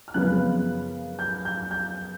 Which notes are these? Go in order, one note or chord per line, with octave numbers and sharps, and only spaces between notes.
F6
F#2 C#3 F3 G#3 B3 F#6
G6
G6
G6